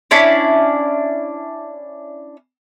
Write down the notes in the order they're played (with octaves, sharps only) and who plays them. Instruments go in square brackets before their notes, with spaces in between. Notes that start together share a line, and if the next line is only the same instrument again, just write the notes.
[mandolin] C#4 D4 E4 D5